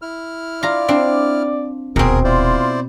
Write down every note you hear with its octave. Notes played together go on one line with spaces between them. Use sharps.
E4 F6
F4 D5 A#5
C4 D4
D#1 D2 B2 C4 G#4 A#4
E4 F4 C5 D5